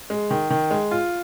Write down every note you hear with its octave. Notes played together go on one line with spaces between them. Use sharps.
G#3
D#3
D#3
G#3
F4